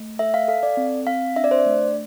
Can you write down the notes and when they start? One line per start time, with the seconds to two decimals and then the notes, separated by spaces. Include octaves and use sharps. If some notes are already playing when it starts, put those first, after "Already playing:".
Already playing: A3
0.19 A4 E5
0.34 F5
0.48 A4 F5
0.63 D5
0.77 C4
1.07 C4 F5
1.36 D4 E5
1.44 D5
1.51 C5
1.59 D5
1.66 A3